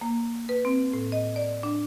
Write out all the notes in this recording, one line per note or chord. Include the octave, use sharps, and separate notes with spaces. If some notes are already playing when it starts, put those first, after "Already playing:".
A#3
B4
C4
A2
D#5
D5
D4